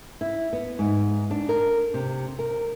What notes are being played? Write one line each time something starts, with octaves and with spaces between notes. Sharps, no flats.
E4
B3
G#2
D4
A#4
C3
A#4